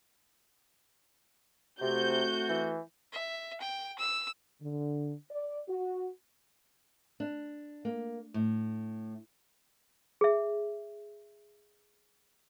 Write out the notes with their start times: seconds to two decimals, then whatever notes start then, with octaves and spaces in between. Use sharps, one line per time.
1.81 C3 A3 C4 F#4 G6
2.48 E3
3.12 E5
3.61 G5
3.98 E6
4.62 D3
5.31 D5
5.69 F#4
7.20 D4
7.85 A#3
8.34 A2
10.21 G#4 E5